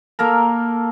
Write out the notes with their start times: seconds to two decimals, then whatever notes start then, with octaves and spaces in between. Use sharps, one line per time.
0.19 A#3 A4 A#4